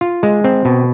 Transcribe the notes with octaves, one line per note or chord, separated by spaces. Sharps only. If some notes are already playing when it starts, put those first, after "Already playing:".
F4
G#3
C4
B2